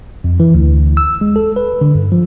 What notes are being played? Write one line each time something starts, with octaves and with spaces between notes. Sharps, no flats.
F2
E3
D2
E6
G#3
A4
B4
D3
G2
F3